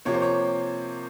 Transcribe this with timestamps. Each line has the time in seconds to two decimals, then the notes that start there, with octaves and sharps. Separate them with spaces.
0.05 C3 F3 A#3 C#5
0.14 C5
0.22 C#5